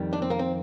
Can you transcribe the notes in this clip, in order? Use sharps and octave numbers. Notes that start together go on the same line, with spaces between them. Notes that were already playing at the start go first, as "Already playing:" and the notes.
Already playing: F2 D#3 G3
D4
C4
A#3
C4